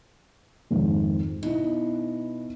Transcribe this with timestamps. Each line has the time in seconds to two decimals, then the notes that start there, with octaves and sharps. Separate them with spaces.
0.71 F2 G#2 D#3
1.43 B2 D#4 E4